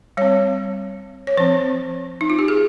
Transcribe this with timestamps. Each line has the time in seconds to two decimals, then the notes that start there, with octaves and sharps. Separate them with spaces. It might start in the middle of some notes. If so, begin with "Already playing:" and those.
0.17 G3 C4 C#5
1.27 C#5
1.37 F3 C4 C5
2.21 D#4
2.30 F4
2.39 G4
2.48 G#4